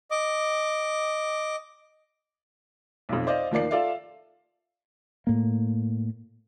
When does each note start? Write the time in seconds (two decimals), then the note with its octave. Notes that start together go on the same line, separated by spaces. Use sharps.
0.11 D#5 D6
3.09 B1 F2
3.27 C5 D5 D#5 F5
3.51 D#2 F3 A#3 D5 C7
3.71 F4 A4 D5 E5 F5
5.27 A2 A#3